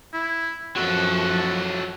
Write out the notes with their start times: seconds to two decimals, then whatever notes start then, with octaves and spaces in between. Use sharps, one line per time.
0.13 E4
0.76 F#2 F3 F#3 F#4 A4